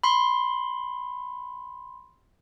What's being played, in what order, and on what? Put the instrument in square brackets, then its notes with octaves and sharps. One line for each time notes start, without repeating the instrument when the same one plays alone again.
[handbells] B5 C6